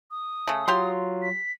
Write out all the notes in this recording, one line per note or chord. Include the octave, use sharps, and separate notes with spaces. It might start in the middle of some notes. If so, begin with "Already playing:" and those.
D#6
C#3 A3
F#3 F4 G4 C6
B6